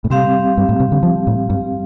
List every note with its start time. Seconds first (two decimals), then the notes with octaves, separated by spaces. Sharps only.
0.04 A2
0.10 C3 G3 C4 G4 F5
0.57 G2
0.69 A2
0.80 C3
0.92 D3
1.03 F3
1.27 A2
1.50 G2